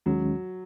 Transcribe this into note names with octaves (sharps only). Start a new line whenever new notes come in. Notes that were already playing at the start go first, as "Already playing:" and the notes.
D#2 D#3 F#3 G#3 C#4